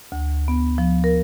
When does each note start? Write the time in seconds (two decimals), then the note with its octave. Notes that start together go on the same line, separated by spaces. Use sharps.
0.12 D2
0.48 B3
0.78 F3
1.04 A#4